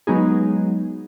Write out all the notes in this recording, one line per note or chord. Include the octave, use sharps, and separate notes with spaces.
F#3 G#3 B3 D#4 G#4